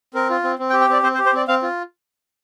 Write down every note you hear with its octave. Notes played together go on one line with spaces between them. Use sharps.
C4 A#4
F4
C4
C4
G5
G4
G5
C4 D5
C4 C5
C5
G4
C5
C4 D5
C4 F5
F4